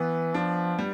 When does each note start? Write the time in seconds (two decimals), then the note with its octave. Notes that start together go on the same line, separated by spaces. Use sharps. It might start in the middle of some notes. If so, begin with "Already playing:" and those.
Already playing: E3 B3
0.34 F3 D4
0.79 G3